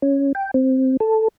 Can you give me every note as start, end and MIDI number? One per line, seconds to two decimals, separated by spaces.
0.02 0.32 61
0.35 0.51 79
0.54 0.97 60
1.00 1.28 69